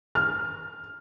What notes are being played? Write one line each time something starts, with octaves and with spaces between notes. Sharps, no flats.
F6